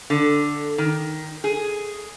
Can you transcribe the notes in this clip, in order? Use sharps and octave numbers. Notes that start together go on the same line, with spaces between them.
D3
D#3
G#4